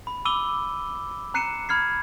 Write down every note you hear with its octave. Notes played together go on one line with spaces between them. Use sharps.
B5
B5 D6 E6 D#7 G7
A#5 F#6 C7 C#7 D#7 E7
B5 F6 G#6 C7